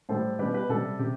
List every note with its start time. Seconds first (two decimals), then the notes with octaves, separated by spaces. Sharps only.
0.09 A2 G3 A4 C5
0.39 B2 G3 G4 B4
0.54 G4 B4
0.69 C3 G3 A4
0.99 C3 G4